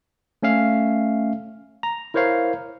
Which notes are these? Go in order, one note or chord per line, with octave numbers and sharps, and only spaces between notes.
A3 C#4 E5 F5
A#5
E4 A#4 C5 C#5 F5